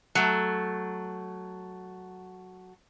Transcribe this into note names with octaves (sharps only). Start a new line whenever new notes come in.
F#3 A3